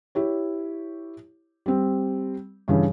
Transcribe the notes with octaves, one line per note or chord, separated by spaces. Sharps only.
E4 G4 C#5
G3 C4
G2 C#3 E3